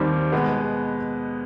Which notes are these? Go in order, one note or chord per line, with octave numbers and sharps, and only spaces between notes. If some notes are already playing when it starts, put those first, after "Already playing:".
Already playing: D#2 D#3 G3 C4
B2 G#3 B3